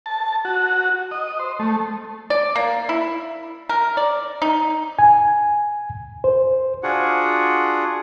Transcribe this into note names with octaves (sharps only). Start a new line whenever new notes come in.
A5
F#4
D#5
C5
A3
D5
A#3
E4
A#4
D5
D#4
G#5
C5
D4 F4 F#4 G#4 F#5